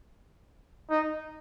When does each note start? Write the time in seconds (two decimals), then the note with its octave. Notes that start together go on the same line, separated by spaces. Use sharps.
0.90 D#4